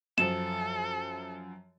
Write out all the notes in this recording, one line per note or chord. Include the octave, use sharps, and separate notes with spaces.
F#2 F3 A4 E7